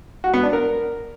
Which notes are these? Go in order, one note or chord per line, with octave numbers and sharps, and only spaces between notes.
F#4
B3
D4
A#4